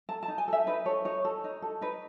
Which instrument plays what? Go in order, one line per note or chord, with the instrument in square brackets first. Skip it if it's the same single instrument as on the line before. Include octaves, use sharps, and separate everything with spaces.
[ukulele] A4 A5
A5
D#4
G#5
A4 E5
D#4 B4
A4 C#5
D#4 C#5
A4
D#4
A4
D#4 B4